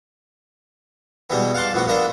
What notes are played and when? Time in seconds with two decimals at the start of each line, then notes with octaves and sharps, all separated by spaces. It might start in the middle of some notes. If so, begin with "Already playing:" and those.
1.30 B2 E3 G3 G#3 B3
1.54 F5 F#5 A5 C6 D6
1.73 A#1 A2 B3 F#4
1.88 A#3 B3 D4 D#5 E5